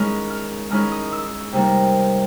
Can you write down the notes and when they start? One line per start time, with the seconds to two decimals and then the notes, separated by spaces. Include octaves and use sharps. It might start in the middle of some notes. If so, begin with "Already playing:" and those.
Already playing: D#3 G#3 C#4 E4 F6
0.30 F6
0.70 D#3 G#3 C#4 E4 F6
0.92 D#6
1.13 E6
1.52 C3 D#3 G3 A#3